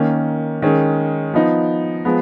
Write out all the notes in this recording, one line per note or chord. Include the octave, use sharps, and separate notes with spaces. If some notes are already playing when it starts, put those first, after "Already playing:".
Already playing: D#3 A#3 C#4
D#3 G#3 C#4
F3 B3 D#4
F3 G#3 B3